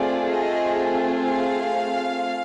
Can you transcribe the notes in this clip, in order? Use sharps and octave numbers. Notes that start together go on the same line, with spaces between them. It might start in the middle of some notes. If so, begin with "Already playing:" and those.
Already playing: A3 C4 F4 G#4 D5
D#5
F5